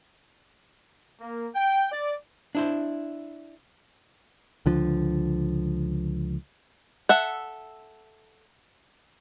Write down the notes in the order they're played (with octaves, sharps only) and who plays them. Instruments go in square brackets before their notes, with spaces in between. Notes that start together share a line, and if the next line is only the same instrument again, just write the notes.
[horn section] A#3
G5
D5
[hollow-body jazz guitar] D4 E4 C5
[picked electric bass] C#2 D3 F3
[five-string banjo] A4 E5 F#5